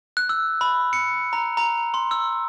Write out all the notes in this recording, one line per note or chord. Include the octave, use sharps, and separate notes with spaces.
F#6
E6
B5
C#7
A#5
A#5
C6
E6